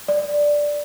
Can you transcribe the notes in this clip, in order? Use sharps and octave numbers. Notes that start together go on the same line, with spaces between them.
D5